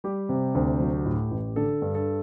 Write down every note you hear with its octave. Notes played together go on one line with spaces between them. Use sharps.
G3 G4
C3
D2
F#3
A2
A1
D3 A4
G2
A4